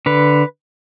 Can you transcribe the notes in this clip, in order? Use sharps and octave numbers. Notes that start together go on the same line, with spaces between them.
D3 B4